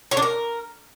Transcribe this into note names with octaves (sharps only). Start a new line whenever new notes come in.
C#5
D4
A#4